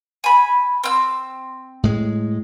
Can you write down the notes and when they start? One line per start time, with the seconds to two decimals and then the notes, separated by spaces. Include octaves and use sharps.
0.24 G#5 B5
0.84 C4 E6
1.83 A2 G#3